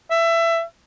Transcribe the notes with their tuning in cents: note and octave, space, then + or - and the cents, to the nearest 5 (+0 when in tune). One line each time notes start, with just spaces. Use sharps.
E5 +20